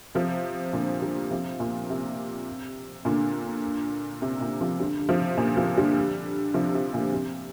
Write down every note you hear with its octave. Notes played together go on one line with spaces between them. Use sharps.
C3 F3
A#2 D3
D3 G3
C3 F3
A#2
C3
A#2 D3
C3
A#2 D3
C3 F3
D3 G3
D3
C3 F3
A#2 D3
C3 F3
D3 G3
C3 F3
C3
A#2 D3
C3